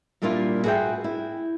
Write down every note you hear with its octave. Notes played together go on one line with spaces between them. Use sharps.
A#2 G3 A#3 D4 E4 F4
F#4 G#4 B4 C5 E5 G5
E4